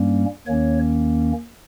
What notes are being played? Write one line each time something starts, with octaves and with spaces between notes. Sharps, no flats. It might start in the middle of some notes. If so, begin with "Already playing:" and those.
Already playing: G2 G3 A#3 C#4
D#2 D#3 A#3 C#4 C#5